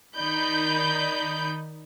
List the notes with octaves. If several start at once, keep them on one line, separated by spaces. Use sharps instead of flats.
D#3 D#4 D5 B5 G6